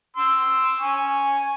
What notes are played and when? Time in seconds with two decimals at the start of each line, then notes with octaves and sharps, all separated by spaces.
0.17 C6 E6
0.81 G#5 C#6